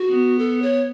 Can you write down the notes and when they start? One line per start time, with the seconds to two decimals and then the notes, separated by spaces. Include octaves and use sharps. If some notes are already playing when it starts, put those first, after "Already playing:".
Already playing: F#4
0.08 B3
0.39 A4
0.62 C#5